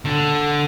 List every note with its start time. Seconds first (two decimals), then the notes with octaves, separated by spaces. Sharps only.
0.05 D3